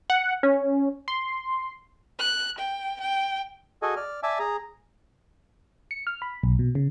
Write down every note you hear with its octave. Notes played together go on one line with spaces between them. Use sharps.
F#5
C#4
C6
F#6
G5
G5
F#4 G#4 A4 D#5 G#5
D5 F6
D5 E5 G#5 A5 D6 E6
G#4 A#5
C#7
F6
B5
B1
B2
C#3